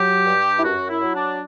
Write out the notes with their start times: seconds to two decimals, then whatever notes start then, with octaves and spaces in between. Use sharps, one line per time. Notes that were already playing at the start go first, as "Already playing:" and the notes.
Already playing: F#3 G4
0.25 G2
0.58 E4
0.63 F#2 F#4
0.89 E4
1.02 F#3
1.14 D4